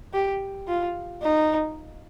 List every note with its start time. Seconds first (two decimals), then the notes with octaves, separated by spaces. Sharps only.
0.13 G4
0.68 F4
1.22 D#4